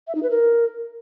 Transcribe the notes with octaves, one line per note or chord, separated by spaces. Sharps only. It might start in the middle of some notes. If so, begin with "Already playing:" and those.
E5
D#4
B4
A#4